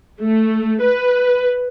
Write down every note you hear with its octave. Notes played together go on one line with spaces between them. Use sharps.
A3
B4